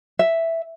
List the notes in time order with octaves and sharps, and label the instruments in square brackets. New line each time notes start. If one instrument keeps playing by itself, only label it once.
[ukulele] E5